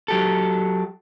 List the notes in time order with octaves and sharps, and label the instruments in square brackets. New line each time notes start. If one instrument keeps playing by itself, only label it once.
[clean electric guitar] F#3 G4 A4